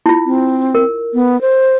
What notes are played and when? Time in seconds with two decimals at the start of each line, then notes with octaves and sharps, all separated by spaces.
0.06 E4 F4
0.26 C4
0.75 A#4
1.14 B3
1.41 C5